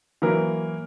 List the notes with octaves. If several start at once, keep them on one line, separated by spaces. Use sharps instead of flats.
E3 F#3 A#3 A#4 B4